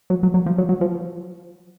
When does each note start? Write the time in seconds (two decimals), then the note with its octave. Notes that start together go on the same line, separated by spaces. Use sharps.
0.10 F#3
0.23 F#3
0.34 F#3
0.46 F3
0.58 F#3
0.69 F#3
0.81 F3